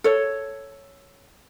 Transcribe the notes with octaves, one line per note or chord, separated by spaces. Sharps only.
A4 C#5